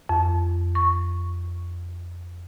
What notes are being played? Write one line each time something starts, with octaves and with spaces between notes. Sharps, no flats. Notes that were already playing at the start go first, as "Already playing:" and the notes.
F2
C#6